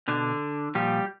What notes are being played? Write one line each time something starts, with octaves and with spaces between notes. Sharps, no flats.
B2 D3 D4
A#2 F3 G3 G4